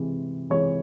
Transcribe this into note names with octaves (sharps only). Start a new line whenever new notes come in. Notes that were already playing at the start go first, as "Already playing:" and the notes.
Already playing: C3 E3 G#3
C3 E3 G#3 C#5